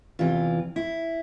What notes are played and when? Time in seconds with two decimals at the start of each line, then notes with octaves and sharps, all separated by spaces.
0.19 E2 C3 E3 F4
0.76 E4